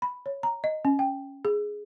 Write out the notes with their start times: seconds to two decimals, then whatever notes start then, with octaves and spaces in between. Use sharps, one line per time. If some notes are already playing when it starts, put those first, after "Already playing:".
0.02 B5
0.26 C#5
0.43 A#5
0.64 D#5
0.85 C#4
0.99 G5
1.45 G#4